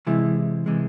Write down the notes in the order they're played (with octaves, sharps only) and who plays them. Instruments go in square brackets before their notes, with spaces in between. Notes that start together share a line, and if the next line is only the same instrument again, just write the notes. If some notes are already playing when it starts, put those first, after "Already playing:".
[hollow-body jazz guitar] C3 E3 G#3 E4
C3 E3 G#3